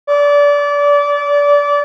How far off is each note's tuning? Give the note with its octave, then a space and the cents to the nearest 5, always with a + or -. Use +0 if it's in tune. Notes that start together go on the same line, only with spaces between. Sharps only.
D5 -25